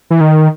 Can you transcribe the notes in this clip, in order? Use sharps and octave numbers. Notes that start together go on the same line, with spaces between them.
E3
D#3